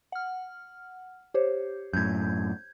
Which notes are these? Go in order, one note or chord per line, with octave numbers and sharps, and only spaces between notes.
F#5 F6
G4 C5 C#5
F#2 A2 G6 G#6